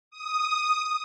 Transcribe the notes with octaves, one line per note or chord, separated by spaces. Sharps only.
D#6